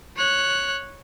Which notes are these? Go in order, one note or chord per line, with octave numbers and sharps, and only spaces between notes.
C#5 F#6